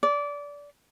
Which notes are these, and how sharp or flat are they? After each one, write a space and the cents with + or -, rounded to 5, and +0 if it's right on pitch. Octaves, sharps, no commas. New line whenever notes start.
D5 -20